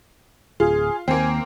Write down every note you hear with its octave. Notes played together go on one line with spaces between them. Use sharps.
D1 F4 G#4
D#2 A#3 C4 G#5